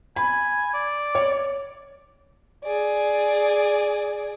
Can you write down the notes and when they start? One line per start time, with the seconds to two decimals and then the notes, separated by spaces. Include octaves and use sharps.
0.16 G#5 B5
0.74 D5
1.15 C#5
2.64 G#4 D5